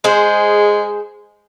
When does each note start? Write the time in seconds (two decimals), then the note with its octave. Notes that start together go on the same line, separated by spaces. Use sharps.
0.04 G#3 G#4 C5